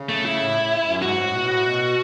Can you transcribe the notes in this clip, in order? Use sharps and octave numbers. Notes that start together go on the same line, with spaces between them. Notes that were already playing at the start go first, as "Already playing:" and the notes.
Already playing: C#3
A3
E4
A2
F#2
G#2 F#4
A2
B2
A2
B2